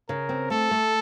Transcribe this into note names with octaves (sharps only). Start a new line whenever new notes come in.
C#3 A#4
C4
A3 A4
A3